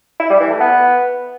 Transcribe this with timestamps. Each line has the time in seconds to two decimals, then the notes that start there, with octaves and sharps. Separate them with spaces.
0.20 E4
0.30 G3
0.40 E3
0.50 A3
0.60 B3